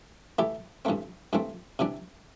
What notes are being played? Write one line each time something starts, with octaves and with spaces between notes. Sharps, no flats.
E3 A3 E4 G4
G2 E3 A3 C4
G2 E3 A3 C4
C3 E3 G3 D4